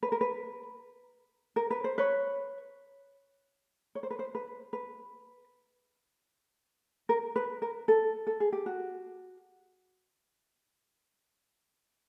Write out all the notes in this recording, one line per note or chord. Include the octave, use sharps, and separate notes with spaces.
B4
A#4
B4
A#4
B4
C5
B4 C#5
C#5
C5
B4
C5
B4
B4
A#4
B4
A#4
A4
A4
G#4
G4
F#4